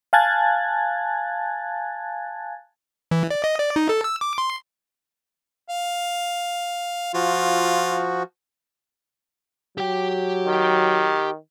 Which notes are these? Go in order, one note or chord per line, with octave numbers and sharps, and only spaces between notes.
F5 G#5 A5 F#6 G#6 A6
E3
D5
D#5
D5
D#4
A4
E6
D6
C6
F5
F3 F4 F#4
F#3 G4 G5
D#3